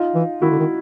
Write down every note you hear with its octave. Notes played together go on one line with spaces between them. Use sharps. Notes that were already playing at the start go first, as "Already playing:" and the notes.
Already playing: D#4 F4
E3
D#3 E4 F#4
D3
D#3